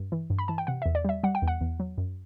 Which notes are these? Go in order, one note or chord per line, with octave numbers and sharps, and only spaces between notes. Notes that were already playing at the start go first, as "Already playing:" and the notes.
Already playing: G2
E3
G2
B5
E3 A5
G5
C3 F#5
E2 E5
D5
G3 E5
G3 F#5
G5
E2
F#5
E2
F#3
F#2